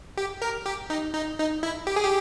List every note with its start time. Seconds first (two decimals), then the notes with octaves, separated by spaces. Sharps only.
0.17 G4
0.42 A#4
0.66 G4
0.90 D#4
1.14 D#4
1.39 D#4
1.63 E4
1.87 G4
1.96 G#4
2.04 G4